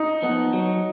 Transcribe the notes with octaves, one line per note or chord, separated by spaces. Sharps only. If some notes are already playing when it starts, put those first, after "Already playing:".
Already playing: D#4
F3 B3
F#3